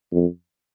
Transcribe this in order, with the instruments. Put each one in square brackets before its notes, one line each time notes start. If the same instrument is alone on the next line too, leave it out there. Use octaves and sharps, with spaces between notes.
[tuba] F2